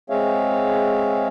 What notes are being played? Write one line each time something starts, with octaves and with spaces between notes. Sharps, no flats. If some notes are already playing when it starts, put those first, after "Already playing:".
G#3 C4 G#4 C#5 E5 F5